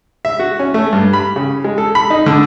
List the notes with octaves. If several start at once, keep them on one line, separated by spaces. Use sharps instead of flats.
E5
F#4
C#4
A3
G2
B5
C#3
G#3
A4
B5
D#4
D3